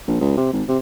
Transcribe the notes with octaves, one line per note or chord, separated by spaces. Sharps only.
A#1
C#2
C3
G#1
C3